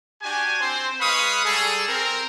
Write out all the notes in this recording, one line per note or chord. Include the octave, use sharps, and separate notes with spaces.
D4 F#4 G4 G#5
C4 C5
G#3 B4 F5 B5 C#6 D#6
G3 G#4 A4
C4 A#4